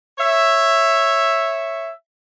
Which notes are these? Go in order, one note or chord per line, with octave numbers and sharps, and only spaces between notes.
C#5 E5